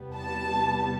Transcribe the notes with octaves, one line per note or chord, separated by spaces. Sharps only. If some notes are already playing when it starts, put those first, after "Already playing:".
Already playing: E2 C3 G3 B3
A5